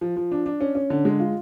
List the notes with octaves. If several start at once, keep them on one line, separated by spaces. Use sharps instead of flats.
F3
F3
D4
D4
C#4
C#4
D3
G#3
F4